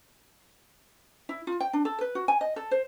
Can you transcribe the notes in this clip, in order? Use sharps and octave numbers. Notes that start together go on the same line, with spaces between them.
E4
F4
G5
D4
A4
B4
F#4
G#5
D#5
A4
C5